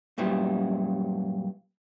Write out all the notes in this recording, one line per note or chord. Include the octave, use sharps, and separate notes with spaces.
F#2 A#2 G3 B3 E4